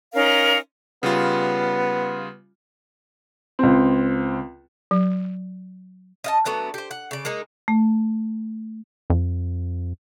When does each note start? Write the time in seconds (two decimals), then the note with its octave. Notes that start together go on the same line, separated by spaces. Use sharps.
0.14 C#4 D#4 A#4 F5
1.03 C#3 G3 B3 F4
3.59 C#2 C4
4.91 F#3
6.24 D#5 F5 A5
6.45 F#3 A3 B3 D4
6.74 G4 C5
6.91 F#5
7.11 C#3 D5
7.25 G#3 A#3 D#4
7.68 A3
9.10 F2